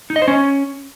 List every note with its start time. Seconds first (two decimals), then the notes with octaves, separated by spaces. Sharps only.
0.10 D#4
0.16 D#5
0.22 C5
0.28 C#4